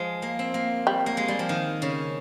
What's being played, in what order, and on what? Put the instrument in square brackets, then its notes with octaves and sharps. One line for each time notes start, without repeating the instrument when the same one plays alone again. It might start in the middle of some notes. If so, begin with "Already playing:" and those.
Already playing: [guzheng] F3 G#3
A#3
C4
A#3
[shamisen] G3
[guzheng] A#3
G#3
G3
F3
D#3
C#3